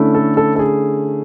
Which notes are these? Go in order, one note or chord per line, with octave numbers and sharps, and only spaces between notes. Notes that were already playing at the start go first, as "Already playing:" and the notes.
Already playing: D3 A3 C#4 E4
A4
A4
A4
G#4